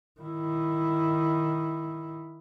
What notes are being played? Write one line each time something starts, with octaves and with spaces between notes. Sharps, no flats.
D#3 E4